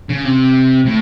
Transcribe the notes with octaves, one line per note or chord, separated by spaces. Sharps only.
C#3
C3
A2